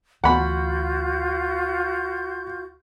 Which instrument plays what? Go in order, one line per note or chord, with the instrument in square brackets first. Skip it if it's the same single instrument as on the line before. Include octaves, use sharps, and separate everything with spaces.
[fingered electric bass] D2 E3 A3 [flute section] F4 F#4 G6 [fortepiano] F#5 B5